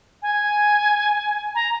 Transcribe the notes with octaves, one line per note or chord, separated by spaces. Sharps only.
G#5
A#5